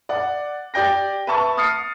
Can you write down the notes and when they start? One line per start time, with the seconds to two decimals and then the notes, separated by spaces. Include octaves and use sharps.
0.09 D5 F#5
0.74 G4 D5 G5 A#6
1.27 B4 E5 A5 C#6
1.57 D#6 F6 A6 C7 C#7